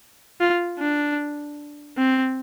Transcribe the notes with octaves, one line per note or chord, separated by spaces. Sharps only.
F4
D4
C4